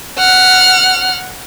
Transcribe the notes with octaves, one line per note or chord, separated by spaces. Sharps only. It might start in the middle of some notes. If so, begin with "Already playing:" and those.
F#5 F6